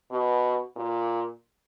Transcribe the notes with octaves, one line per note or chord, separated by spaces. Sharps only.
B2
A#2